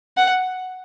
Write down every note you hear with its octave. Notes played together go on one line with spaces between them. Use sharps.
F#5